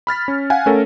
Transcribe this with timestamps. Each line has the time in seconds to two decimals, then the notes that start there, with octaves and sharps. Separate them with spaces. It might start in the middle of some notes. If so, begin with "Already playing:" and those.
0.07 B5 F6 A6 B6
0.28 C#4
0.50 F5 F#5 G#5
0.66 A3 C#4 A4 A#4